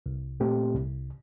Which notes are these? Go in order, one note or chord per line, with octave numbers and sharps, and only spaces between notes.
C2
A#2 A3 C4 G4
C2